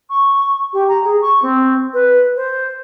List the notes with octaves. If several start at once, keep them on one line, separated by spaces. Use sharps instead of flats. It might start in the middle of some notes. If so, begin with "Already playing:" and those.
C#6
G4
A#5
G#4
C#6
C4
B4
C5